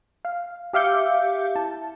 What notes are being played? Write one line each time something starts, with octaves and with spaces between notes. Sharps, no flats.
F5
G4 E5 F5 D6 G6 C#7
E4 A5